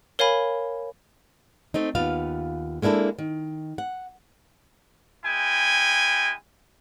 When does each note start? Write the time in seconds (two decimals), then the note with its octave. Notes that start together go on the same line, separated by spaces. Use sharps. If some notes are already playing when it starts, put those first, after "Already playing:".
0.19 A#4 C#5 F5 G#5 B5
1.74 A3 C4 D#4
1.95 D#2 B3 F4 F5
2.82 G#3 A#3 D4 E4 A4
3.18 D#3
3.78 F#5
5.26 G#3 E4 G5 G#5